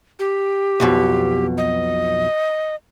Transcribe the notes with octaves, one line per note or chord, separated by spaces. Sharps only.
G4
B1 F2 B2
D#5